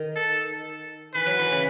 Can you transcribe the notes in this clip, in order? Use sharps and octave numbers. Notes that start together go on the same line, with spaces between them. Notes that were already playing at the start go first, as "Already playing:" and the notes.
Already playing: D#3
A4
E3 B4
F#3
E3
C#3